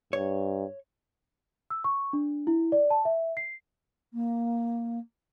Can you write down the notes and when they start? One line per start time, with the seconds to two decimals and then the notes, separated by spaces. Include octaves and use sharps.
0.13 G2 C#5
1.70 E6
1.84 C#6
2.13 D4
2.47 E4
2.72 D5
2.90 A5
3.05 E5
3.37 C7
4.13 A#3